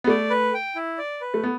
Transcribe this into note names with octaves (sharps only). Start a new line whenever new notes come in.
B3
A3 D5
B4
G5
E4
D5
B4
A3
B3